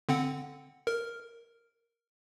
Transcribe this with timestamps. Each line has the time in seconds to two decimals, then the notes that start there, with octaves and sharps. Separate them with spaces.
0.09 D3 C4 F#5
0.87 A#4